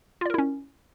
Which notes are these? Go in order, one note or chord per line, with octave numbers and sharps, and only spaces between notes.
C#4 E4 F4 A#4 D5